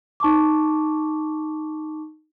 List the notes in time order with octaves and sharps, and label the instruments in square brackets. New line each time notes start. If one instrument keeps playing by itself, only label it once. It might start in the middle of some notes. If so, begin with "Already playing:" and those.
[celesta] D#4 A5 C#6 D6